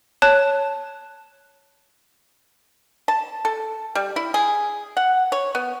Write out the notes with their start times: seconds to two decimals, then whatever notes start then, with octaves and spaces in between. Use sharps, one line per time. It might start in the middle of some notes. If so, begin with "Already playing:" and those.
0.22 C#5 A5 F#6
3.08 A5
3.45 A4
3.95 G3
4.16 E4
4.34 G#4
4.97 F#5
5.32 C#5
5.55 B3